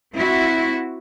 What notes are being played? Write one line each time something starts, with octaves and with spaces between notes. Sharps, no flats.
C4 E4 F#4